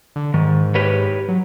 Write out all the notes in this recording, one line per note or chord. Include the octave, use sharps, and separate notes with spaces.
D3
G#2 D#3
G4 B4 C#5
F#3